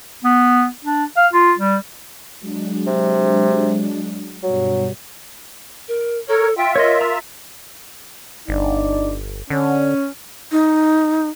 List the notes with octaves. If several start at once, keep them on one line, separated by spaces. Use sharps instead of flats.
B3
D4
F5
F4
G3
F#3 G#3 D4
C3
G2 B2 F#3 G3
A#4
A4 A#4 C#5
F4 E5 G5
A#4 C#5 D#5
A#5 E6
G1 D4 D#4 D5
D3 C#4
D#4